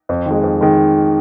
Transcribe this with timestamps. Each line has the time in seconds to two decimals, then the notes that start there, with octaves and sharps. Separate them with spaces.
0.09 F2
0.26 D#3 G#3
0.43 F2
0.61 D#3 G#3